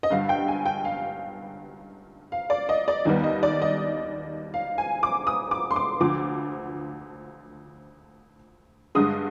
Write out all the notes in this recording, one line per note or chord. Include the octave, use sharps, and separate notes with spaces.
D#5
G2 D3 G3 F5
G5
G#5
G5
F5
F5
D5
D#5
D5
D#2 D#3 G3 B3
D#5
D5
D#5
F5
G#5
D6
D#6
D6
C6
D6
D2 D3 F3 D6
G2 D3 G#3 D#6